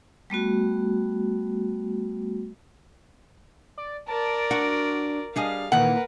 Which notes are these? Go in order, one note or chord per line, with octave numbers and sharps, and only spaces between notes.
G3 A3 B3 F#4
D5
A#4 D5 A5
D4 F#4
G3 D4 G#4 D#5 F5
A#2 D#3 E3 A#3 A#4 B4 F#5